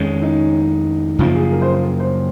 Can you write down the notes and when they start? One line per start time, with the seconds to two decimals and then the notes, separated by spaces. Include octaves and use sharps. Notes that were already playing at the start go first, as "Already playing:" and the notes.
Already playing: F2 D#3 G#3 C#4
0.22 D#4
1.19 F#2 C#3 F3 A#3 F4
1.36 G#4
1.52 A#4
1.62 C5
1.73 C5
1.84 A#4
2.00 C5